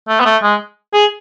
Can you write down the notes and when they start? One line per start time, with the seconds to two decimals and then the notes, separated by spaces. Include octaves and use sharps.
0.08 A3
0.20 B3
0.25 A3
0.43 G#3
0.94 G#4